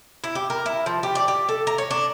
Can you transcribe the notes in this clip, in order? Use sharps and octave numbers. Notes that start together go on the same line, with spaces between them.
E4
G4
A#4
E4
F3
G4
D5
G4
A4
A#5
C#5
D4